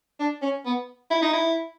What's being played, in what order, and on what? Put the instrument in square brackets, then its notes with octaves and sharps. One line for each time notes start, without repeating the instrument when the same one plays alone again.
[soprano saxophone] D4
C#4
B3
E4
D#4
E4